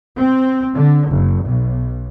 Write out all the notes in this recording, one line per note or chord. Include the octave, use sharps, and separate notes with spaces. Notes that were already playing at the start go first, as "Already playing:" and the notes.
C4
D3
F#1
B1